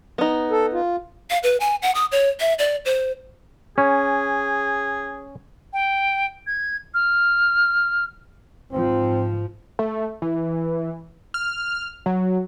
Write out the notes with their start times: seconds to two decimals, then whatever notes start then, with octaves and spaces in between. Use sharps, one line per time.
0.18 B3 D#4
0.51 A4
0.73 F4
1.30 F5
1.43 B4
1.60 G#5
1.82 F#5
1.95 D#6
2.12 C#5
2.40 E5
2.59 D5
2.85 C5
3.78 C#4 G#4
5.73 G5
6.47 G#6
6.94 F6
8.73 G#2 F3 C4
9.79 A3
10.22 E3
11.34 F6
12.06 F#3